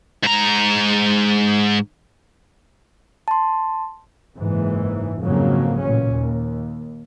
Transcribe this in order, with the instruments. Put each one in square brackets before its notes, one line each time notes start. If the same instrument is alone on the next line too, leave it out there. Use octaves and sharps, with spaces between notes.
[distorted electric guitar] G#2 A#5
[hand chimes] A5 C6
[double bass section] F#1 G#2 E3
F2 G#2 C#3 F#3 A#3
A1 A#2 C#4
D#2